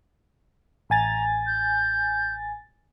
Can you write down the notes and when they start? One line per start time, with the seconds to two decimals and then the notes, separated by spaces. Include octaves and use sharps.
0.90 A1 G#5 A#5 A6
1.47 G6